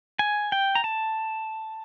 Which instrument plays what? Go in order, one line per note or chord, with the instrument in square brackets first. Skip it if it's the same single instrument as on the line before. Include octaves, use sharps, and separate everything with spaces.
[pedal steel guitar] G#5
G5
A#5
A5